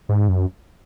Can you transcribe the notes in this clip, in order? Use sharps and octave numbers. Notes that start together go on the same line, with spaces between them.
G#2
F#2